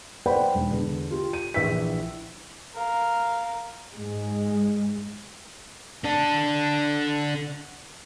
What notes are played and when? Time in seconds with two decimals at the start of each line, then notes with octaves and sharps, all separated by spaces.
0.26 B4 C5 D5 F#5 G5 B5
0.55 E1
0.71 E2 D3
1.11 F4 G4
1.33 D#7
1.54 A#1 E3 E6 B6
2.75 A#4 F5
3.94 G#2 G#3
6.05 D4 A4